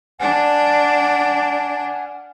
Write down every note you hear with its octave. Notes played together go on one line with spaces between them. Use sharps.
D4 F#5 G#5 F6